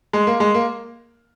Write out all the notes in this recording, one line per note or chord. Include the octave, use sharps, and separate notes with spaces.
G#3
A#3
G#3
A#3